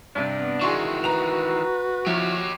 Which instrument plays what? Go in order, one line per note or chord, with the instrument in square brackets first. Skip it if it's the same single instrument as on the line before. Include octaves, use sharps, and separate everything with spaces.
[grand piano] G2 C3 [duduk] C4 [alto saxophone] D4
[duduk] B3
[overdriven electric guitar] D#3 E3 [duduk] F#4 [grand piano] G#4 C6 C#6
[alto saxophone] B4 [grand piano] A#5 F7
[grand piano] F3 [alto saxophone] E4 [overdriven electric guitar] G4 C#5